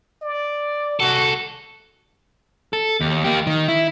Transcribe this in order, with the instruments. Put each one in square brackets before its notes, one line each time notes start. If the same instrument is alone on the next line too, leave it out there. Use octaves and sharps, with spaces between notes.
[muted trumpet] D5
[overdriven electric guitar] C2 A4 [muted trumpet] F#4
[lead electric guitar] A4
D#2
A#3 G4
D#3
E4